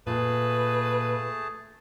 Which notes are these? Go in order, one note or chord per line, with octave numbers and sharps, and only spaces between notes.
A#2 A3 G#4 B4 A5